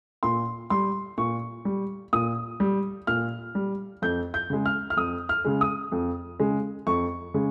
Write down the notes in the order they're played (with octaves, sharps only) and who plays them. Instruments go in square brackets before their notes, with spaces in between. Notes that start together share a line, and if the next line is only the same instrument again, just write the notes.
[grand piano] A#2 C6
G3 C6
A#2 C#6
G3
A#2 D#6
G3
A#2 F6
G3
F2 G6
G6
C#3 G#3
F6
F6
F2 D#6
F6
C#3 G#3
D#6
F2
C#3 G#3
F2 C#6
C#3 G#3